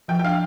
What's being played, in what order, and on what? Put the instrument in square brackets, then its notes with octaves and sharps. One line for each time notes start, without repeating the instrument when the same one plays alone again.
[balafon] F3 [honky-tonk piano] G5
[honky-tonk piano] G5
[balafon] D4 [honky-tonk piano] F5